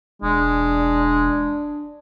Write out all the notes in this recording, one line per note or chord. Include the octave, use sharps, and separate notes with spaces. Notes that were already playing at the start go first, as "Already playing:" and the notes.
E1 G#3 D4